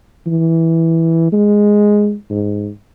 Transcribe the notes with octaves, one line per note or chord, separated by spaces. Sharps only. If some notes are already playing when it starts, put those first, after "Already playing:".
E3
G#3
G#2